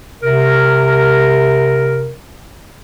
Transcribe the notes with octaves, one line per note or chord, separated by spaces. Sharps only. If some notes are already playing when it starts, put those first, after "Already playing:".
C3 A#4